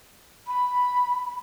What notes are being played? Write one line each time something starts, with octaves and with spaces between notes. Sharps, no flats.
B5